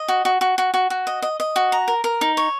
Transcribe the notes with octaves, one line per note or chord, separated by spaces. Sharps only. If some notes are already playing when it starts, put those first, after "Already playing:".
Already playing: D#5
F#4
F#4
F#4
F#4
F#4
F#4
D#5
D#5
D#5
F#4
A#5
A#4
A#4
D#4
C#5